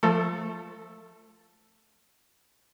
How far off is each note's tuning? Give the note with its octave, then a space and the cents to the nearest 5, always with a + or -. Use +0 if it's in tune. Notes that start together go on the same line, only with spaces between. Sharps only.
F3 +0 A3 +0 A4 +40